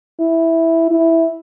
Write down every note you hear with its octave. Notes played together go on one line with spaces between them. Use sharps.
E4
E4